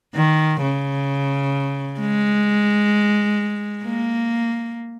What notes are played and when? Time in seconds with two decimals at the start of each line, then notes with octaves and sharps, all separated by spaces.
0.15 D#3
0.62 C#3
2.00 G#3
3.84 A#3